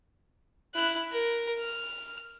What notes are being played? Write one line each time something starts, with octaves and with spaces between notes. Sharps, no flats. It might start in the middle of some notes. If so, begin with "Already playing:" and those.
E4 F#6
A#4
F6